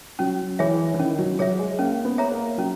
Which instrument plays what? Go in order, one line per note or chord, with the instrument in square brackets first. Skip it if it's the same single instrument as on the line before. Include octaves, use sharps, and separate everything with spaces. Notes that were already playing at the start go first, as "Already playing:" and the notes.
[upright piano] F#3 [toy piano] C#4
[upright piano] E3 [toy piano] G#4 C#5 E5
[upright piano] E3
[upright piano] D#3 [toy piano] C#4
[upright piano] F#3
[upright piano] F#3 [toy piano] G#4 C#5 E5
[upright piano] G#3
[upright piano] A#3 [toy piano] C#4
[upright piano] B3
[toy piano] G#4 C#5 E5 A#5
[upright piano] A#3
[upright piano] F#3 [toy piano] C#4